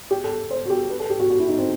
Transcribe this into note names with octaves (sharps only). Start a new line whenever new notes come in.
G4
A4
C5
F#4
G4
B4
A4
G4
F#4
F#4
E4
D#4
C4